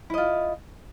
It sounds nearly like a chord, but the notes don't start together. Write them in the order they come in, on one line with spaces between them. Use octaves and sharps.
E4 D#5 F4